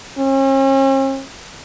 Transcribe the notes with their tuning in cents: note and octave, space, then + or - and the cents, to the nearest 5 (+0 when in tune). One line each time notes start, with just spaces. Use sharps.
C#4 -45